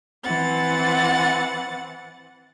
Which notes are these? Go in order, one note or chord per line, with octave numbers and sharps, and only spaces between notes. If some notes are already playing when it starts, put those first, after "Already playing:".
E3 C4 F#5 A6